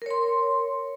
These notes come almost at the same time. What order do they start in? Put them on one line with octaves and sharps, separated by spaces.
A#4 C#5 C6